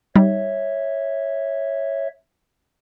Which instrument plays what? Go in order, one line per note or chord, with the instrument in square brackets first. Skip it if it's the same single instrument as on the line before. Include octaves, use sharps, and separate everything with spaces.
[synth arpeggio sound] G3 D#4 [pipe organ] C#5 E5